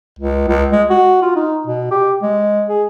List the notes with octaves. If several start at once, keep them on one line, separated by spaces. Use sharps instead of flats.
C#2
C#2
G#3
F#4
F4
D#4
B2
G4
G#3
G#4